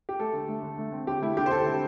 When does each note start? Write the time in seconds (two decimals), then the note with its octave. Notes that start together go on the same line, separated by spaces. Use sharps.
0.09 G4
0.20 A3 A4
0.33 D3
0.48 A3
0.63 D3
0.78 A3
0.92 C4
1.07 D3 G4
1.22 A3 E4
1.37 D3 G4
1.46 C5
1.51 D3 A4
1.66 C4